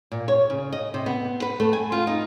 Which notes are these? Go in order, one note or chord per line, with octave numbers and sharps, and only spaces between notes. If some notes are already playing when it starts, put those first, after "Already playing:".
A#2
C#5
C#3
D#5
C3
B3
B4
A3
G#5
F4
D#4